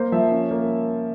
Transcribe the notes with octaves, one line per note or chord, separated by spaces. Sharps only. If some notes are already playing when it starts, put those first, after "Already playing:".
Already playing: A#3 C5
F3 E5
C#4
A#3